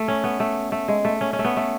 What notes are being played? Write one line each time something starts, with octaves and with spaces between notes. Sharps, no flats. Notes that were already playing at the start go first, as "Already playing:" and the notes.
Already playing: A3
C#4
B3
A3
A3
G#3
A3
C#4
C#4
A3
B3
A3